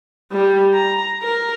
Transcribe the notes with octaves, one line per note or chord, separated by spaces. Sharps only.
G3
A#5
A#4